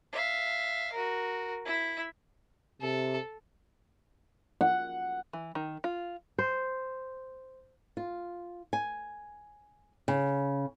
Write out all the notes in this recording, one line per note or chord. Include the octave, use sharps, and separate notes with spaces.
E5 F5
F#4 A#4
E4 E5
C3 A4
F#5
E3
D#3
F4
C5
F4
G#5
C#3